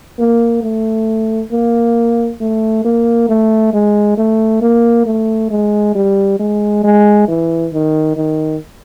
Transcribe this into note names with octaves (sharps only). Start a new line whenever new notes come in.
A#3
A3
A#3
A3
A#3
A3
G#3
A3
A#3
A3
G#3
G3
G#3
G#3
E3
D#3
D#3